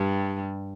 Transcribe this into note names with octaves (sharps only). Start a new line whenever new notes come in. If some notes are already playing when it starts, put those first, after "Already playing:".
Already playing: G2 G3